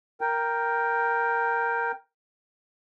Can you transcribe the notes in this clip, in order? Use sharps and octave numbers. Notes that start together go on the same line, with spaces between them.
A#4 G5